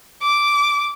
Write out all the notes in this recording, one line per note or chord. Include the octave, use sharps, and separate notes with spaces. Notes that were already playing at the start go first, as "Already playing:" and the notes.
D6